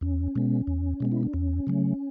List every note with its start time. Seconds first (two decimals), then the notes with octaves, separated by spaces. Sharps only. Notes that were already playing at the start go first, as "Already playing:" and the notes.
0.01 E2 C#4
0.35 B2 G#3 B3
0.67 E2
1.00 B2 G#3 B3
1.12 E4
1.23 D4
1.33 E2 C#4
1.67 C#3 F#3 A3